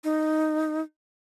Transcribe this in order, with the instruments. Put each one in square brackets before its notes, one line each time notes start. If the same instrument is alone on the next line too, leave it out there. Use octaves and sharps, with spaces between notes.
[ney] D#4